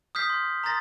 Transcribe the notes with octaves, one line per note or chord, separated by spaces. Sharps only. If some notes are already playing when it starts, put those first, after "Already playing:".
D#6 F6 G6 B6 C7
C6
A#5 C6 D#6 A6 A#6